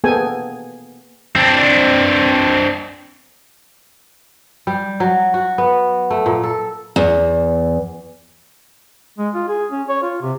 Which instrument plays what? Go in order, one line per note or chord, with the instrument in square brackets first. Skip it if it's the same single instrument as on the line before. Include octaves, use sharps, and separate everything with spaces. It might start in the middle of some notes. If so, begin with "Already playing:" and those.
[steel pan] A#3 B3 G#4 A4 G5 G#5
[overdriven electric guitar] C4 D4
[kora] G3
F#3
F#4
B3
A3
A#2
A4
[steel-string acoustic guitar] E2
[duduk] G#3
F4
G#4
C#4
C#5
F4
C3